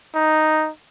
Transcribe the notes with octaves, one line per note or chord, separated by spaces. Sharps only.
D#4